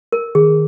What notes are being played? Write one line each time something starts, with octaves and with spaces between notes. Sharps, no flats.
A#4
D#3 G#4